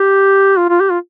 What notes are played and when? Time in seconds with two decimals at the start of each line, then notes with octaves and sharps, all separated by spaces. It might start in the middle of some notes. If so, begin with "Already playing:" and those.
Already playing: G4
0.58 F4
0.69 F4
0.81 G4
0.91 F4